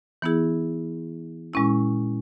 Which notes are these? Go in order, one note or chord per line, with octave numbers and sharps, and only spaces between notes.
E3 B3 E4 G#4
A#2 G#3 C#4 E4